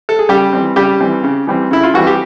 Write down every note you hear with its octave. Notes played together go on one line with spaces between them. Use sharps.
A4
G#4
C#3 G3 G4
E3 G3 C4
C#3 G3 G4
E3 G3 C4
C#3
E3 G3 C4
C#3 E4
F4
E3 G3 C4 F#4
G4